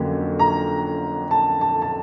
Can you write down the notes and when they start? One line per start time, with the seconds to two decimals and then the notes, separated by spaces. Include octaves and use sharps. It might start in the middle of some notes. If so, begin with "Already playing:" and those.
Already playing: F2 D3 F#3 A#3 C#4
0.39 A#5
1.31 A5
1.61 A5
1.82 A5